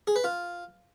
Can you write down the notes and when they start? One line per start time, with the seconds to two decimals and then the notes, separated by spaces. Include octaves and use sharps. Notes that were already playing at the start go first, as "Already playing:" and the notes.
0.07 G#4
0.16 B4
0.24 F4